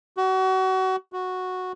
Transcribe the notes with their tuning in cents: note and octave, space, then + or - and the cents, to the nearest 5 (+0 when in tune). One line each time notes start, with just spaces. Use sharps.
F#4 +30
F#4 -5